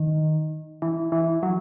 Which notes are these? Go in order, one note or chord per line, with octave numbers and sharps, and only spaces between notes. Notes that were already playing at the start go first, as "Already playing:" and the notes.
Already playing: D#3
E3
E3
F#3